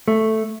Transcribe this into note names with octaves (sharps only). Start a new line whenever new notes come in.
A3